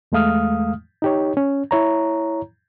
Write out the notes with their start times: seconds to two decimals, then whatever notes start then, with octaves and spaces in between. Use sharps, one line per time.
0.12 E2 G#3 A3 F5 D#6 F6
1.02 D#4 G4 C#5
1.37 C#4
1.71 E4 C#5 A#5